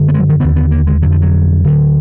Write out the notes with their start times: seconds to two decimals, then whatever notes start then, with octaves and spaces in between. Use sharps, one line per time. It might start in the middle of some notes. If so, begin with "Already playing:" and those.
Already playing: F#2 D3
0.08 B3
0.14 G#3
0.19 F#3
0.29 D#3
0.40 D#2 D3 B3
0.56 B3
0.71 A#3
0.87 G#3
1.02 F2 D3 F#3
1.12 F3
1.22 F#3
1.64 D2 D3